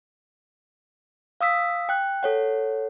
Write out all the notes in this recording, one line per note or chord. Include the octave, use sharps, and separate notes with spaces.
F5 D#6 E6 B6
G5 F#6
A4 C#5 F#5